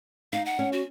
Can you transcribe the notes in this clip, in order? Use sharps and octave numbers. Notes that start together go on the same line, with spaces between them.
D#4 F5
F#5
C#4
F#4